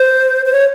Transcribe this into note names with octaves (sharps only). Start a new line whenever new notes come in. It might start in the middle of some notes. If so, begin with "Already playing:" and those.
Already playing: C5
C5
C#5